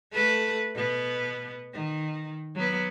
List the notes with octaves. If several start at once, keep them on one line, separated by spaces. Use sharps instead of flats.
A3 A4 B4
B2 B3
D#3
F#3 B3